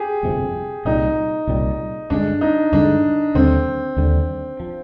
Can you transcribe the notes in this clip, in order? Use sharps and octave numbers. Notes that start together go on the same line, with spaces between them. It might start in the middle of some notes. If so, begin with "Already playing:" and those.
Already playing: G4 G#4
G1 F2 C3
C2 A#2 G3 D#4
C2 A#2 G3
G2 D3 G#3 D4
D#4
G2 D3 G#3 D4
D#2 D3 G3 C4
D#2 D3 G3
F3